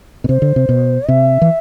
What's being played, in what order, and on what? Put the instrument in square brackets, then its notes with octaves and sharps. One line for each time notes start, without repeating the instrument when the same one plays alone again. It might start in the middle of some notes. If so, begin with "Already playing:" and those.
[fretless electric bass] B2
[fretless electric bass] C3 [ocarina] C5
[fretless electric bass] D3
C3
B2
[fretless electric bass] C3 [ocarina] E5
[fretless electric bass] E3